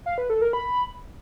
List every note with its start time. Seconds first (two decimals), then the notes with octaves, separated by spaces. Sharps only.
0.06 F5
0.18 B4
0.30 A4
0.41 A#4
0.53 B5